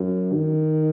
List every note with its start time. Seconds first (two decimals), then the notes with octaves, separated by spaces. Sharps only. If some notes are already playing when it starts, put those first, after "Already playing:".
Already playing: F#2
0.34 D#3